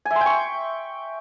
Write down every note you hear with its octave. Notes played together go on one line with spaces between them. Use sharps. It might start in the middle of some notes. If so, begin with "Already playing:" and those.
G#5
E5
C6
G5
C#6